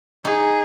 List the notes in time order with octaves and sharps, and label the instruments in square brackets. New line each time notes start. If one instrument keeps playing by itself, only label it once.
[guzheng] D#4 [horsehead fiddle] G#4